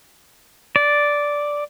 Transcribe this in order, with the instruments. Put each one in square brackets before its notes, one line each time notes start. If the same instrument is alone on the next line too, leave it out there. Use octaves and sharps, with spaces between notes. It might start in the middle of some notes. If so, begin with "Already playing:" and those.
[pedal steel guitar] D5